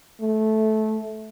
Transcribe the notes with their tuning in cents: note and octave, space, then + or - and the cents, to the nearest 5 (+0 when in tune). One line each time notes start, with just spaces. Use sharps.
A3 -15